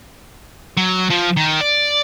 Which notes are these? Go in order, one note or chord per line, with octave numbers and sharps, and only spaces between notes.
F#3
F3
D#3
D5